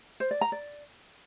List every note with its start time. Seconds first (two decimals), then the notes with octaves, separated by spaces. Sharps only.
0.20 C5
0.31 D5
0.41 A#5
0.52 D5